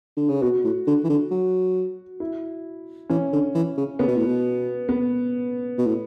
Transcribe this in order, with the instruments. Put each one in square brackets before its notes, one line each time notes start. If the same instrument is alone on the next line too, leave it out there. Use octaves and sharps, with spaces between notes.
[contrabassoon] D3
C#3
[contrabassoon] B2 [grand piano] F#4
[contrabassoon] A2
D3
E3
D3
F#3
[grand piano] E4
[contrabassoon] E3 [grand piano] C#4
[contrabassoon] D3
E3
C#3
[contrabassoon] C#3 [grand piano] B3
[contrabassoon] B2
A2
B2
[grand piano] B3
[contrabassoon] B2
A2